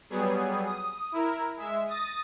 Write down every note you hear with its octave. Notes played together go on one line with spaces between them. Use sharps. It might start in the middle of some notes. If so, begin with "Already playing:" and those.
F#3 G3 B3 G#4
D#6
E4 A#4
G#3 E5
D#6 A6 A#6 D#7